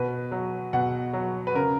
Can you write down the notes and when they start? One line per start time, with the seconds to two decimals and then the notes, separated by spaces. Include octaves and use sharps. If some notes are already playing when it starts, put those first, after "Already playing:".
Already playing: B2 B4
0.32 F#3
0.73 B2 F#5
1.13 F#3
1.47 B4
1.54 C#3 A#4